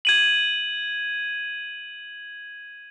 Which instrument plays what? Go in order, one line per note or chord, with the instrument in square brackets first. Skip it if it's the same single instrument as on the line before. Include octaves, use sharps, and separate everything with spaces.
[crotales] G#6 D#7 F#7